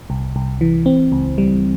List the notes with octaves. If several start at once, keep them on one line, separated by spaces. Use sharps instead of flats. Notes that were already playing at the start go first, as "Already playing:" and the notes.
C2
C2
E3
C4
C#2
G3